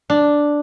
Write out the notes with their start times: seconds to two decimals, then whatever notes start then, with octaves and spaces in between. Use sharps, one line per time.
0.10 D4